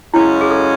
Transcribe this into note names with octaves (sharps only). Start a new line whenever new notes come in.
F#2 C#3 G#3 C#4 E4
G#4
A4